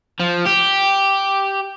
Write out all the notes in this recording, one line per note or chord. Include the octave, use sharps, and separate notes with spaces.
F3
G4